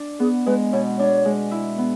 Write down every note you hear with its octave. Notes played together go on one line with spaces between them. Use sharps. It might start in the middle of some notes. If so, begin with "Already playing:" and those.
Already playing: D4
B3 G#4
G#3 B4
B2 C#5
D4 C#5
G#3
E4
B3